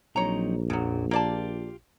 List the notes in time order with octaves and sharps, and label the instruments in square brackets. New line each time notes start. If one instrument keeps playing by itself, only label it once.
[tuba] A#1 [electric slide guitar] F#3 C4 D#4 [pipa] C#5 A#5
[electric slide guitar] F2 A#2 [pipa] C#3 F#3
[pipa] A#3 D5 A5 [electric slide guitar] F4 G4